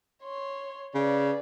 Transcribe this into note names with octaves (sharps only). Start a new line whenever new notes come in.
C#5 C6
C#3 B4 D5